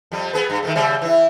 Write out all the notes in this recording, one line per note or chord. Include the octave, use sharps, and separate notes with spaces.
F2 G3
B3 G#4 B4
G2
D#3 F3 A3
C#3 G3 C4
E3 E4